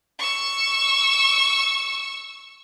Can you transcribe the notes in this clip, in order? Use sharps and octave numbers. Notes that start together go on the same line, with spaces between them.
C#6 E6